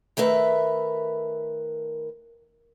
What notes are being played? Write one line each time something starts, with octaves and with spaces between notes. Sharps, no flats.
D#3 A3 A#4 B4 E5